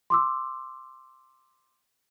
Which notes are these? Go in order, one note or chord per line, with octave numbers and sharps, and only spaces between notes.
C6 D6 E6